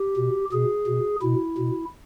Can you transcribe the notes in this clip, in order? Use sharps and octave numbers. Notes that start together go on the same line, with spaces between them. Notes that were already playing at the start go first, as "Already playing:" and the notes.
Already playing: G4
B2
B2 G#4
B2
B2 E4
B2